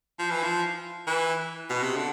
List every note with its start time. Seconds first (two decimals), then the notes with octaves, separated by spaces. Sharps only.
0.19 F3
0.31 E3
0.43 F3
1.07 E3
1.70 B2
1.83 C3
1.96 D3